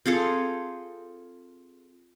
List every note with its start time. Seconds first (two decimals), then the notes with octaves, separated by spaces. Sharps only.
0.06 C4 F4 G#4 A4